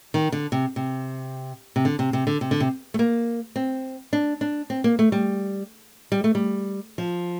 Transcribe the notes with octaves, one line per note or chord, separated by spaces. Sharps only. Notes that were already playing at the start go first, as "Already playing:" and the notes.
D#3
D3
C3
C3
C3
D3
C3
C3
D3
C3
D3
C3
A3
A#3
C4
D4
D4
C4
A#3
A3
G3
G3
A3
G3
F3